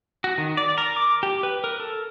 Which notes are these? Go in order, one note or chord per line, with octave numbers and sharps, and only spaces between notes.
F#4
D#3
D5
A#4
D6
G4
B4
A#4
A4